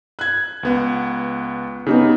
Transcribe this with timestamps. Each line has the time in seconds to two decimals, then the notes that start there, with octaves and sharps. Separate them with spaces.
0.19 F#6 G#6
0.63 C#2 B3 F#5
1.86 C#3 B3 D#4 G4